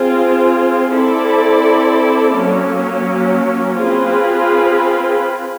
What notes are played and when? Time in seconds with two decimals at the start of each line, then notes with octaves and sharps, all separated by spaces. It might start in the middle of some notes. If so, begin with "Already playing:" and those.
Already playing: C4 F4 G#4
0.94 C4 E4 A4 D5
2.36 F#3 A#3 C#4
3.80 C4 F4 G#4 B4